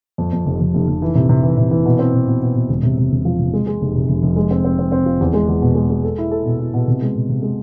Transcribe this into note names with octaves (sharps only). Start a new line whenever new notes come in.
F2
F2
F1
F1
F1
F1
E3
C3
C3
E3
C3
E3
B2
C4
B2
B2
B2
B2
E1
C3
C3
E1
F3
C3
G#3
G#3
F1
C3
F1
F1
G#3
C4
C4
C4
C4
F4
E2
G#3
E2
B2
G#3
G#3
A4
E4
A4
B2
E4
B2
C3
G#3
C3
C3
G#3